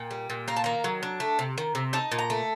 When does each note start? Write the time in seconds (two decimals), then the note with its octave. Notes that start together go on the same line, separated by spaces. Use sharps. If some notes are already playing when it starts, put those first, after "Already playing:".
Already playing: A#2 G5
0.11 G3
0.30 A#2
0.48 A#3 A#5
0.56 A5
0.64 D#3 A#5
0.84 F#3
1.03 D4
1.20 A3
1.39 C3
1.58 D#3
1.75 C3
1.93 D#4 A5
2.12 A#2
2.19 A#5
2.30 A3